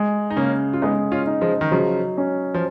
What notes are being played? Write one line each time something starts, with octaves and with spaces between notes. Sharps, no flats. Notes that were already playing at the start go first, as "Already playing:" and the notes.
Already playing: G#3
D#4
C#3 A#3 C#4
F4
G#3 B3 D#4
C#4 F4
D#4
F3 G#3
D#3
C#3 F3 F#3
C#4
F3